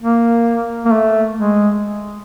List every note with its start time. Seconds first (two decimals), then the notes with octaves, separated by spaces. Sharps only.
0.01 A#3
0.85 A#3
0.92 A3
1.37 G#3